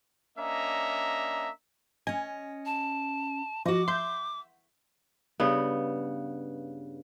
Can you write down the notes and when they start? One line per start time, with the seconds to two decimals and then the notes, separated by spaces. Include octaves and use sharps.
0.38 A#3 C#4 D4 D#5 E5 A#5
2.07 C#4 D#5 G#5
2.66 A5
3.65 F3 F#4 D#5 D6
3.88 E5 C6 G6
5.40 G2 C#3 B3